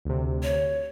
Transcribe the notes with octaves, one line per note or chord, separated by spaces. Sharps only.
D2 C3
C#5